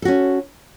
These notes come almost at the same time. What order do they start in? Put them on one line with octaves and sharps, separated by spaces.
A4 F#4 C#4